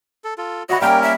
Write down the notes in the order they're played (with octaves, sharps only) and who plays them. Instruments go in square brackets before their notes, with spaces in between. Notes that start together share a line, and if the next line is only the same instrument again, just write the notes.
[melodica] A4
F4 A4
[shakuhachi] F#4 [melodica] C#5 D#5 [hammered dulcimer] E5 B5
[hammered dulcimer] G3 A#3 B5 [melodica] C#4 A#4 [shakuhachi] G5
[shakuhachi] E5